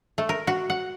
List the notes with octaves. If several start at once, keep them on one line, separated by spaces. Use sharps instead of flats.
A3
A#4
F#4
F#5